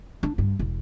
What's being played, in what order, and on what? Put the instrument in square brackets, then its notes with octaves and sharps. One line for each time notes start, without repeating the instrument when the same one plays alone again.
[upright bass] D4
G2
E1